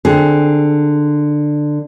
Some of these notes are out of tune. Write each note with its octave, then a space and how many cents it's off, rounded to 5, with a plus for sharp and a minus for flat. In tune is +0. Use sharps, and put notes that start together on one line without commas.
D3 +15 C4 +10 G#4 +25